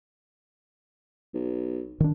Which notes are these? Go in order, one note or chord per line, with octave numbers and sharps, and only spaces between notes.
B1
D#3 D4